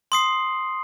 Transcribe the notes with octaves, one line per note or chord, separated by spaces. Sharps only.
C6 D#6 C7